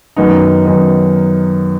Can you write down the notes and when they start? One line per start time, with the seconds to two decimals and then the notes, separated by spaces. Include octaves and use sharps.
0.16 F#2 D#3 B3 D#4
0.65 F#2 D#3 B3 D#4